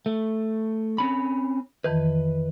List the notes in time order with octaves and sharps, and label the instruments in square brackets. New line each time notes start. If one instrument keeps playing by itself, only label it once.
[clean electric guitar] A3
C4 C#4 B5
[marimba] F2 D#3 E3 [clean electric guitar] B4